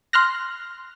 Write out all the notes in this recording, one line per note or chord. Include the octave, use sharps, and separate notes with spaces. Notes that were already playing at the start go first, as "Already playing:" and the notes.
C6 F6 F#6 A#6